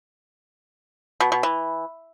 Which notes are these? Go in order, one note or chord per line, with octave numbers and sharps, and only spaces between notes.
B2
B2
E3